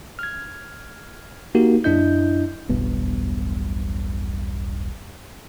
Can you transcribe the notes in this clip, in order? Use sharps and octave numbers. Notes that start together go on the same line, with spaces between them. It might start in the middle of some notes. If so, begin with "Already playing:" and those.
F6 G#6
A#3 D#4 F#4 G4 A#4
F#2 D4 E4 D#5 G6
E1 B1 G2 B3